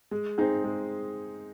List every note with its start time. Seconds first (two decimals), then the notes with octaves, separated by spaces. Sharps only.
0.11 G#3
0.38 C4 D#4 G#4
0.64 G#3